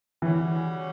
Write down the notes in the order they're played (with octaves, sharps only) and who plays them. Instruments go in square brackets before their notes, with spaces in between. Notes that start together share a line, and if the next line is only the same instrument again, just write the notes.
[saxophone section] C#3 G3 C#4 F#4 [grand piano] E3